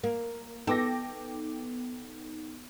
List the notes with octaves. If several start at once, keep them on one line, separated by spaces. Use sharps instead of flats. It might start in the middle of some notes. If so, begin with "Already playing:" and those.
A#3 A#4
B3 D#4 A4 G5 D6 A#6